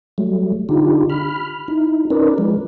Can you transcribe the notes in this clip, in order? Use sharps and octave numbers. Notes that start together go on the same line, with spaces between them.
F#3 G3 A3
D3 D4 D#4 F4 G4
B5 F6
D#4 E4
C#4 D#4 A#4 B4 D5
F3 G#3